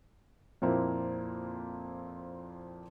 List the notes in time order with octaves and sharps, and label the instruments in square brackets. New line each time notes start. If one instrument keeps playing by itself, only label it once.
[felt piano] F2 A#2 A#3 C4 E4